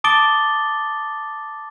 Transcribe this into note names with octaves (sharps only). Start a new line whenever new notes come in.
A5 D6 D#6 A6 D7 G7